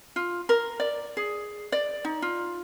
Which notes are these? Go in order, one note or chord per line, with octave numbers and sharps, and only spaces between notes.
F4
A#4
D5
G#4
D5
D#4
F4